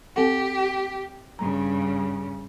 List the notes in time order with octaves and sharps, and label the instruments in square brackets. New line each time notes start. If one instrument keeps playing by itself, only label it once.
[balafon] C4 A4 F#5 [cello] G4
[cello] G2 C#3 [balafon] A#5